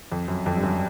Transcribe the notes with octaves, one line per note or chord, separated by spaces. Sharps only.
F2
F#2
F2
G2
F#2